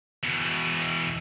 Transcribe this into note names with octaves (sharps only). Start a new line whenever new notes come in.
E2 B2